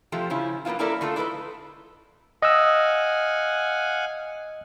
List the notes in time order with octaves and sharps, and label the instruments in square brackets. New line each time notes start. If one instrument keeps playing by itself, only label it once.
[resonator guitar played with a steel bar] C3 F3 A3 G4
C#3 F3 C#4 E4
F#3 A#3 B3 E4 F4
A#3 C#4 E4 A4 A#4 D5
D3 A3 F4 A4
D4 E4 A4 B4 D#5
[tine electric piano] D#5 E6 [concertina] F5 F#5 G#5